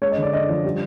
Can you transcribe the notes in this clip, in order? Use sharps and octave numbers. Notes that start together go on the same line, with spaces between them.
G#3 C#5
D#5
D3
D5
D3 D#5
F3
G3